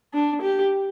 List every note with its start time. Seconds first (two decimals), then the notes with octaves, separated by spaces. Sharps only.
0.14 D4
0.42 G4